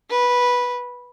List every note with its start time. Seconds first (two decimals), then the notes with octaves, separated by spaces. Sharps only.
0.10 B4